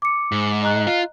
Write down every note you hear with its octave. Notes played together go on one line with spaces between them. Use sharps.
D6 C#7
G#2
D#5 A#5 F#6
F4